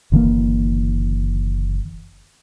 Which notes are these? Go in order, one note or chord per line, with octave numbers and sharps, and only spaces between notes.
F#1 D3 E3 A#3